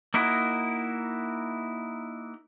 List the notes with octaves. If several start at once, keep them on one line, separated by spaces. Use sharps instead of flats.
A#3 D#4 E4 F#4 A#4